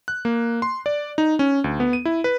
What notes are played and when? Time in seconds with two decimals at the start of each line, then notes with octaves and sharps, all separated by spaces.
0.08 F#6
0.25 A#3
0.62 C6
0.86 D5
1.18 D#4
1.39 C#4
1.64 D2
1.80 B3
1.93 D#7
2.05 E4
2.24 B4